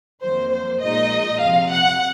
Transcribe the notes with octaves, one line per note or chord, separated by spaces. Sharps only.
F2 D#3 F#3 A#3 C5
C5
A#1 A#2 G#3 D#4 D#5
F2 C3 F3 F5
F#5